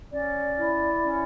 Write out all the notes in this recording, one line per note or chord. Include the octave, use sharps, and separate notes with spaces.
C#4 D5
E4
C#4